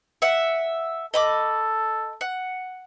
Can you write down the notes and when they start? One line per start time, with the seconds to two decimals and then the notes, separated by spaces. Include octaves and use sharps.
0.22 E5 F#5
1.14 A4 D#5 B5 D6
2.21 F#5